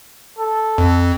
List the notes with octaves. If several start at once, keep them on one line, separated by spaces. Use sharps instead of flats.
A4
F2